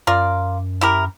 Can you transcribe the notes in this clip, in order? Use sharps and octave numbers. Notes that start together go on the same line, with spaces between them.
F#2 F4 A#4 D5
E4 G4 A#4